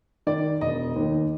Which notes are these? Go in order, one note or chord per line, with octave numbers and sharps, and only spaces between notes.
D#3 D5
E1 D#5
D#2 D#3